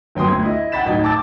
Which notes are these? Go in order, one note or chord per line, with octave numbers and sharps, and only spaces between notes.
G1 F#3 G5 C6 D#6
D2 G#6
E4 D#5
F#5 G5 B5 A6 B6 E7
D1 D#4 G5 D#6 G#6
G5 A5 D6 E6 A6